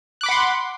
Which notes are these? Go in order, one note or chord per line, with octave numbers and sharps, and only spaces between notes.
F#5 B5 C6 D6 F#6